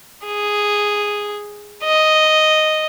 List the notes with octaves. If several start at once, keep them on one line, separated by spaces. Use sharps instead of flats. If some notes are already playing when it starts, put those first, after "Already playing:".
G#4
D#5